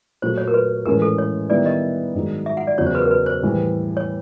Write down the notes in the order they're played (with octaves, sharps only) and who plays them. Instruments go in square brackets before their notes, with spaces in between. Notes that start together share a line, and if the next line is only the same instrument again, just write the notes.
[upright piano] A#2 F#3 A3 [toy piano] C5
[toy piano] C#5
A#4
B4
[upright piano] A2 E3 G#3 C#4 [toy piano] A#4
[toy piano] A4
C#5
[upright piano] D#3 G3 B3 E4 [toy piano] D5
[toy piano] D#5
[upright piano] G#2 D#3 F#3
[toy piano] E5
F#5
D5
[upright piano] E2 C#3 F#3 [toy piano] C#5
[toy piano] C5
B4
A#4
B4
C5
[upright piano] A2 E3 G3
[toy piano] C#5